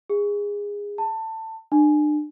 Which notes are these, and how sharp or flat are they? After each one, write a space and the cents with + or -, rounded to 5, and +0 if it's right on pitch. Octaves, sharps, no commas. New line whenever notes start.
G#4 -20
A5 +20
D4 +35